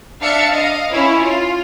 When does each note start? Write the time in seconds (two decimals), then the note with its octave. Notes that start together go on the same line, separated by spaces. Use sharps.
0.21 D4 E5 F5 A6 C#7
0.53 D#5 F5
0.92 C#4 E4 C#5
1.21 F4